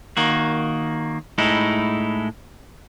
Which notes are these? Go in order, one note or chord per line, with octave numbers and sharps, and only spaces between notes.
D#3 A#3 F#4
A2 G#3 D#4 E4